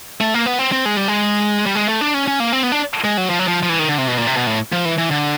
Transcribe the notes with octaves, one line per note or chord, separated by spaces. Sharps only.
A3
A#3
B3
C4
C4
G#3
G3
G#3
G3
G#3
A3
D4
C#4
C#4
A#3
C4
B3
D4
G#3
F#3
F3
F#3
F3
F3
E3
D#3
D3
C3
B2
A#2
C3
B2
A2
F3
E3
E3
D3